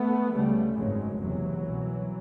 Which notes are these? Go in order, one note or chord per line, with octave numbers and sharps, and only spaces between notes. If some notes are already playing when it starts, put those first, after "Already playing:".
Already playing: A3 B3
C#2 C#3 G3 A3
G#1 F#2 C#3 F#3 G#3
F#1 E2 C3 E3 F#3
C2 B2